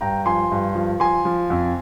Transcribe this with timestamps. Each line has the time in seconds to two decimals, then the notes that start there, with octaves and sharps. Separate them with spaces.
0.01 G2 G5 A#5
0.26 F3 G#5 C6
0.51 G2
0.75 F3
1.00 F3 G#5 C6
1.25 F3
1.50 F2